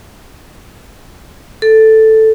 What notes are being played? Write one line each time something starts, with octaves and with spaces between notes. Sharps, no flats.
A4